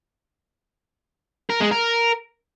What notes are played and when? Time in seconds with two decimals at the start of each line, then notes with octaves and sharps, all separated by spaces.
1.50 A#4
1.61 G#3
1.72 A#4